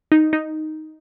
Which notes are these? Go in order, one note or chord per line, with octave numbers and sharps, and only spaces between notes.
D#4
D#4